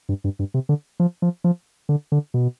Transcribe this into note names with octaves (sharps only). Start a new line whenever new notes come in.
G2
G2
G2
C3
D3
F3
F3
F3
D3
D3
B2